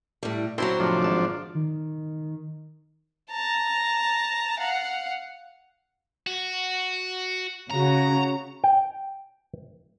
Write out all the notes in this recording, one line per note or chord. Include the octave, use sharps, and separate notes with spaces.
A2 G3
F#3 C4 D4 E4 F#4 C5
A2 C3 F3 D4
G#1 A5
D#3
A5 A#5
F5 F#5
F#4
C#3 F#4 A#5
G5